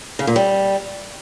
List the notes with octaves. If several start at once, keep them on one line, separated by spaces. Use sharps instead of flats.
C#3
A#2
G3